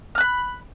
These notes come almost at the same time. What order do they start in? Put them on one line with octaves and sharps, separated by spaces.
F6 F#6 B5